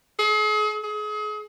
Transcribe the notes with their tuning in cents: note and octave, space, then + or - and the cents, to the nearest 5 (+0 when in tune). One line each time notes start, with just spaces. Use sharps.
G#4 +40
G#4 +35